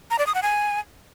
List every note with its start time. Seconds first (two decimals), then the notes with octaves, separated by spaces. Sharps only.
0.10 A#5
0.18 D5
0.26 D#6
0.34 F#5
0.42 G#5